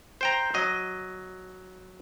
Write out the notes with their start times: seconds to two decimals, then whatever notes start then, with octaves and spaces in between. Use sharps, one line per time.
0.21 C5 G5 A#5
0.54 F#3 D#5